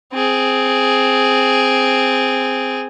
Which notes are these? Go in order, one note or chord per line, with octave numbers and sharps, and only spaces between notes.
C4 G#4